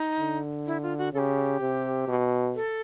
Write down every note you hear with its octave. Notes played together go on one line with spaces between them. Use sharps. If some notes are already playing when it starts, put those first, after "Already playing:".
Already playing: D#4
D3
E4
F4
F#4
C#3 G4 A4
C3
B2
A4